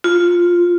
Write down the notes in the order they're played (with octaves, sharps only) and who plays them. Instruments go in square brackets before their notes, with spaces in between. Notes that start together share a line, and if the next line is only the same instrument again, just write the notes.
[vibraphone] F4